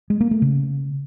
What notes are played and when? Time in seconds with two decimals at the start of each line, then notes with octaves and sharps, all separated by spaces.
0.10 G#3
0.21 A#3
0.31 A3
0.42 C#3